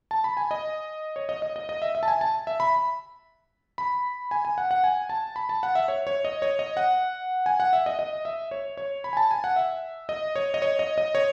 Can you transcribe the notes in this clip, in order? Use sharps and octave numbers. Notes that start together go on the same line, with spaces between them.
A5
B5
G#5
D#5
C#5
D#5
D#5
D#5
D#5
E5
E5
A5
G#5
A5
E5
B5
B5
G#5
G#5
F#5
F#5
G#5
A5
B5
A5
F#5
E5
C#5
C#5
D#5
C#5
D#5
F#5
G#5
F#5
E5
D#5
D#5
E5
C#5
C#5
B5
G#5
A5
G#5
F#5
E5
D#5
C#5
D#5
C#5
D#5
D#5
C#5